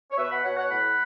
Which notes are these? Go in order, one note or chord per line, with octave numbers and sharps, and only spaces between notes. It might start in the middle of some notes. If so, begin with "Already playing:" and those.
C#5
B2 B4 E5
F#5 B5
B2 C#5 F#5
C#5 F#5
A2 F#5 B5